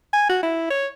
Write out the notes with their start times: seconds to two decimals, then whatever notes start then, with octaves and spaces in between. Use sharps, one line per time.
0.13 G#5
0.29 F#4
0.43 E4
0.70 C#5